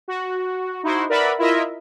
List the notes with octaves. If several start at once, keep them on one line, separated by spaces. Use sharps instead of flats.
F#4
D#4 E4 F#4 C5
A#4 B4 D5 E5 F#5 B5
E4 F4 A#4 D#5 E5